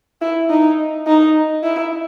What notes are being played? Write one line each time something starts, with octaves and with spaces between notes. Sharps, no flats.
E4
D#4
D#4
E4